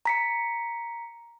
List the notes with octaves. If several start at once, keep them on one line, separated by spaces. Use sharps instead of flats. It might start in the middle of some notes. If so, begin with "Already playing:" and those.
A#5 B6 C#7